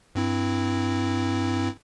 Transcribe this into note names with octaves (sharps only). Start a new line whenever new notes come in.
G2 C4 E4